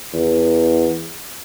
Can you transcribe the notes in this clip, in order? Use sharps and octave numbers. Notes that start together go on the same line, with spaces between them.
E2